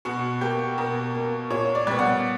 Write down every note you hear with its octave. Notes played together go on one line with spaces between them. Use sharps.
B2 F#4
A#3 G4
B2 A#4
A#3
A#2 C#5
D5
G3 B3
F#5